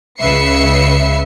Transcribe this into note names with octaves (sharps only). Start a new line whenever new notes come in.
C#2 C#3 B4 E5 C7 C#7